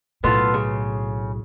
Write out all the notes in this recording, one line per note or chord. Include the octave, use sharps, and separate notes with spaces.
B1 A2 B3 F4 A4
C#3